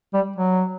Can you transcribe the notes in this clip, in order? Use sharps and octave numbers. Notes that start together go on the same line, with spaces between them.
G3
F#3